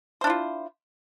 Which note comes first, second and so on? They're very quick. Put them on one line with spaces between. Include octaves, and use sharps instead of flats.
C5 D4 E4 F4